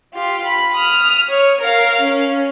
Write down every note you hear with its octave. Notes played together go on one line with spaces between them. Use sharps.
F4 G4
B5
D#6 F6
C#5
A#4 F5
C#4